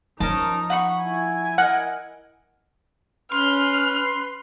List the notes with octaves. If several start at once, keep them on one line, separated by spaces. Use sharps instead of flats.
F3 C#4 D#4 A#4 A5
F#5 B5 C#6
E4 G#5
A#4 D#5 F#5
C#4 B4 C6 F6